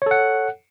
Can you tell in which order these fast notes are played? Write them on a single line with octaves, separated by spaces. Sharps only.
C#5 A4 F#5